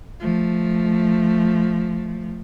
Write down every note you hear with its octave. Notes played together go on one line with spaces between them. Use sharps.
F3 A3